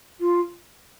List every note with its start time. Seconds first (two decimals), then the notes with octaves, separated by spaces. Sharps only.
0.21 F4